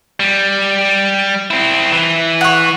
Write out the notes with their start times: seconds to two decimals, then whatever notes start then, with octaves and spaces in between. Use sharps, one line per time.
0.20 G3
1.51 C4 E4
1.93 E3
2.41 F#5 C#6